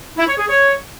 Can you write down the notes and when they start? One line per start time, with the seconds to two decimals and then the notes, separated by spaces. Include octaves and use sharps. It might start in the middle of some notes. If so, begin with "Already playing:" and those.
0.16 E4
0.27 C#5
0.38 G#4
0.49 C#5